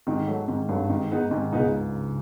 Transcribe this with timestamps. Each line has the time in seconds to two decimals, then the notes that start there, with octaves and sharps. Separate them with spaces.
0.07 G#2 D#3
0.27 F#3 A3
0.48 G#2 D#3
0.69 G2 F#3 A3
0.89 G#2 D#3
1.10 G#3 B3 D#4
1.31 G#2 D#3
1.52 C#2 C#3 G#3 B3 D#4